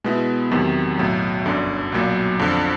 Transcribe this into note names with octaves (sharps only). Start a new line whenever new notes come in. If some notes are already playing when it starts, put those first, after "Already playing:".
B2 G#3 B3 E4
E2 C3 D#3 F#3
B1 A2 F#3
G1 F#2 D3
B1 A#2 F#3
F2 D3 F3